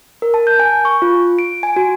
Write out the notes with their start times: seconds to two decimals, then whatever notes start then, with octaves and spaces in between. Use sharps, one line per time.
0.22 A#4
0.34 A5
0.47 G6
0.60 G#5
0.85 C#6
1.02 F4
1.39 D7
1.63 G#5
1.76 F#4